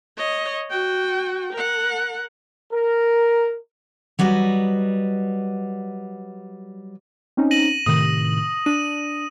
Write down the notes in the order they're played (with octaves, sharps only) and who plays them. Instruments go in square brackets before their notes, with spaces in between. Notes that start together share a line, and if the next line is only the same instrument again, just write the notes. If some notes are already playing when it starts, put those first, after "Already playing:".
[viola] C#5 D#5
F#4 G5
A#4 F#5
[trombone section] A#4
[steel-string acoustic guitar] F#3 G3 B4 D#5
[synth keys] C4 C#4 D#4
[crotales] A#6 D#7 F#7
[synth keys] A2 C3 D#3 [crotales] D#6
[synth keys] D4 [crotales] D#7